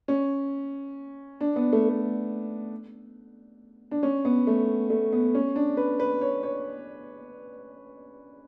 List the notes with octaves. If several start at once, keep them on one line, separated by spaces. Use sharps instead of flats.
C#4
D4
B3
A3
A3
D4
C#4
B3
A3
A3
B3
C#4
D4
B4
B4
C#5
C#5